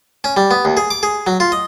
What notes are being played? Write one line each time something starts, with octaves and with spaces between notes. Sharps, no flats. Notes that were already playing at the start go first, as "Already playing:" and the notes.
C#4
G3
B3
D#2
G#4
D6
G#4
F#3
F4
D#5